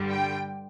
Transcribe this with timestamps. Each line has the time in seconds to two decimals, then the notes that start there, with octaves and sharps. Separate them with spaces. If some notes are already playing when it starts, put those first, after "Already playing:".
Already playing: G2 D3 G3
0.12 G5